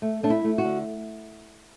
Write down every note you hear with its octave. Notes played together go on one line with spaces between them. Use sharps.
A3
A3 D4
E4
A3
F#4
D3